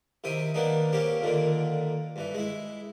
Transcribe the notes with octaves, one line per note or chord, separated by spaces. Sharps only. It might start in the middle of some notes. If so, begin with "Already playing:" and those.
C3 D#3 E4 G5 D#6
D#3 A#3 B3 D4 D#4
A#3 C4 C#4 G4
A#2 D3 D#3 A#3
G2 E3
G#3 E4